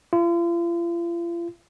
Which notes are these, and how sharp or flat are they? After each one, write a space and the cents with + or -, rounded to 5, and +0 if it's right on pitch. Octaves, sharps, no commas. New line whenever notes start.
F4 -40